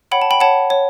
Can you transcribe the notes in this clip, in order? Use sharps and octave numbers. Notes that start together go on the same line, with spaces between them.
C#5 F#5 G5 B5
A5
G5 B5
C#5 F#5 A5
C#5